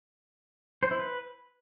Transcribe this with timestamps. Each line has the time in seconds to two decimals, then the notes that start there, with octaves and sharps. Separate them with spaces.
0.83 C5
0.91 E4
0.99 B4